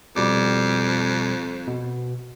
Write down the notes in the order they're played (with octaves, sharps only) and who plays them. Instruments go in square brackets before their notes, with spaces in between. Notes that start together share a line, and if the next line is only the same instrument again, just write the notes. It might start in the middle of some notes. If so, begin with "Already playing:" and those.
[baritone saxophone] F2 [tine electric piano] B2 G3 D6
[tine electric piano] B2